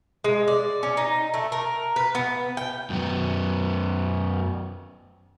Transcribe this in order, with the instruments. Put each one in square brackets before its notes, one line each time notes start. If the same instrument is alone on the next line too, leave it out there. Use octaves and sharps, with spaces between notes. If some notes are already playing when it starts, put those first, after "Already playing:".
[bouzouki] G#3
D5
C#4
D#4
A3
A#4
B4
B3
G5
[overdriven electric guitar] F#2 B3